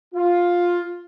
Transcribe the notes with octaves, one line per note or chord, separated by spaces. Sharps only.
F4